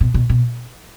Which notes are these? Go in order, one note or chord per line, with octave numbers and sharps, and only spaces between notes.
B2
B2
B2